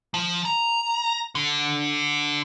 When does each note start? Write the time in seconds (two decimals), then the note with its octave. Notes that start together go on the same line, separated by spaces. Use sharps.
0.14 F3
0.45 A#5
1.35 D3